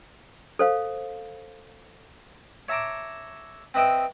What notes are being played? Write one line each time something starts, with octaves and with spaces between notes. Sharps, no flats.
A4 C5 F5
C#5 E5 A5 A#5 C#6 D6
C4 B4 D#5 E5 G5